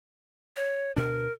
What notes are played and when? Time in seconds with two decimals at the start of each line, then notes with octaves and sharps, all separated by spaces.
0.56 C#5
0.96 D2 B2 D4 A#4